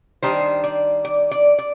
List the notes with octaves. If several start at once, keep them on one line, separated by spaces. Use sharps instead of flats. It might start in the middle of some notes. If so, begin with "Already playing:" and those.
D#3 G3 D4 C5
D5
D5
D5
D5